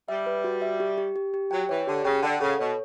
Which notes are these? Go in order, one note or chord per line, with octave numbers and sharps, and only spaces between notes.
G3 E5
B4
F#4
E5
G4
G4
G4
G4
F#3 G5
E3 C#5
D3 G4
C#3 G5
D3 F#5
C#3 A4
B2 C#5